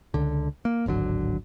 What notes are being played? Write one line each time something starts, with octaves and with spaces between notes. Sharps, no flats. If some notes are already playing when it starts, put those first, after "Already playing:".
C#2 D3
A#3
D1 G#1 D3 F#3